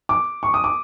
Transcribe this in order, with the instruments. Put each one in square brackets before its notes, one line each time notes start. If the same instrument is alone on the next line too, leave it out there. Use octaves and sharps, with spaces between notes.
[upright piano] D6
C#6
D#6
D6